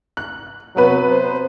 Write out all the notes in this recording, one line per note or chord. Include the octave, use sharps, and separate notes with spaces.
F#6
C3 F#3 B3 B4
C5